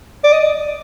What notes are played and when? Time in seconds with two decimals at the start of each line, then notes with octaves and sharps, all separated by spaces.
0.24 D5
0.32 D#5